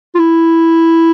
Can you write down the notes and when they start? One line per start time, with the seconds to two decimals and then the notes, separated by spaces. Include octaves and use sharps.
0.15 F4
0.19 E4